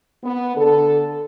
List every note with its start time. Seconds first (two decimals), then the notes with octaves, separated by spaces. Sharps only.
0.24 B3
0.56 D3 A4